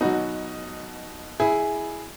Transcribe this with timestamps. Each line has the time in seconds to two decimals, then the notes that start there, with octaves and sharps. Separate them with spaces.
0.01 B2 F#3 D#4 F#4
1.40 E4 G#4